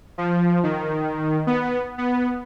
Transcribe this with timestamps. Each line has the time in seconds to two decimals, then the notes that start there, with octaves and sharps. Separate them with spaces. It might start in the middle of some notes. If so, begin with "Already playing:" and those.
0.18 F3
0.63 D#3
1.47 B3
1.98 B3